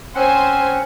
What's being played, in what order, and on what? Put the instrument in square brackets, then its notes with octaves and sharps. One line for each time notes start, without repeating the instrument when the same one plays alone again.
[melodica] C4 C#4 F#5 [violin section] C5 G#5